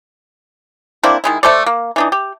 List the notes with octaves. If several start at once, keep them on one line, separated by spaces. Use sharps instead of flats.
A#3 C4 D4 E4
D#3 G#3 E4
A3 A4 C5 D5
A#3
E3 D4 D#4
G4